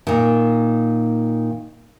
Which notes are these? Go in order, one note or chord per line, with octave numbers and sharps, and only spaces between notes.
A#2 D#3